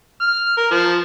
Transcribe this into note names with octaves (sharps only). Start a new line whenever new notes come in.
F6
A#4
F3